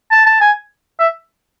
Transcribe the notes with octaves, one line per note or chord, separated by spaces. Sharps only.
A5
A5
G#5
E5